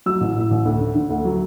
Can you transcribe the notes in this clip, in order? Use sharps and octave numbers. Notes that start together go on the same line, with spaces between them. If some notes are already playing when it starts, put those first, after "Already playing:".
F#3 E6
A1
A2
A1
D2
D3
D3
D2
F#3